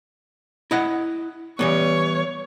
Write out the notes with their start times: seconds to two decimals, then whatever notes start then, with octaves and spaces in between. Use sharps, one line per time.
0.71 E4 D#5 F#5
1.59 E3 G3 B3 C#5